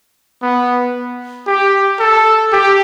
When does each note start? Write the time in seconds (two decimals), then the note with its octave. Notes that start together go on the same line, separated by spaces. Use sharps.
0.42 B3
1.47 G4
1.99 A4
2.52 G4